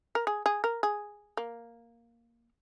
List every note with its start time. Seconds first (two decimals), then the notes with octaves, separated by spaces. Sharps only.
0.15 A#4
0.27 G#4
0.46 G#4
0.64 A#4
0.83 G#4
1.37 A#3